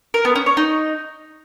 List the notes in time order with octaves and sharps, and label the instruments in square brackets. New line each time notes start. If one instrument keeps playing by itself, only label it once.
[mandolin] A#4
B3
C#4
C#5
D#4